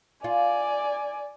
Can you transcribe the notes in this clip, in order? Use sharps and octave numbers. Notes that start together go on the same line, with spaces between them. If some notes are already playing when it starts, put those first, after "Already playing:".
F4 D5 G#5